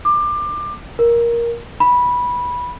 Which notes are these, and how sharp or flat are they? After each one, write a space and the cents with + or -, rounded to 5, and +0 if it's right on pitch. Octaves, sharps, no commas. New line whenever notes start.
D6 +25
A#4 +10
B5 -10